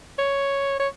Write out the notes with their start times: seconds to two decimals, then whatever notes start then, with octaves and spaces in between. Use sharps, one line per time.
0.19 C#5
0.80 C#5